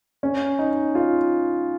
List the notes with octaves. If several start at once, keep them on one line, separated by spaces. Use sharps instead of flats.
C#4
D#4
F4